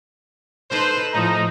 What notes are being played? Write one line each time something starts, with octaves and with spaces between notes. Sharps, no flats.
D#4 A4 B4 C5
A2 F3 D#4 A#5